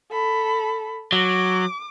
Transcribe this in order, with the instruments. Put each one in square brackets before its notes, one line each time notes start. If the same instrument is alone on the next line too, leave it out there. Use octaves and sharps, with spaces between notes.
[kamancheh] A4 B5
[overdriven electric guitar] F#3 [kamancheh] D6